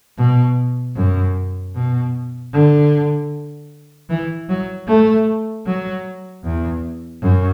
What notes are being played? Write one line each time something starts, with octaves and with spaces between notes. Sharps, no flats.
B2
F#2
B2
D3
E3
F#3
A3
F#3
E2
F#2